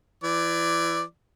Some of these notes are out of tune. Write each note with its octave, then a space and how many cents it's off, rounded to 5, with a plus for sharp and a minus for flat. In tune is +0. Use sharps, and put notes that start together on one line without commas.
E3 +25 D5 +0